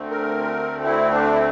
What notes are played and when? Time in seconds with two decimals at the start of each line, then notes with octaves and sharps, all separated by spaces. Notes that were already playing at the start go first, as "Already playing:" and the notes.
Already playing: D2 D3 A3 C4
0.11 A#4
0.85 E4
1.12 D4
1.33 E4